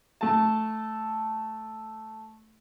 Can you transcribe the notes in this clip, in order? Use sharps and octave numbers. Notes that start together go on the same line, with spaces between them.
A3 A5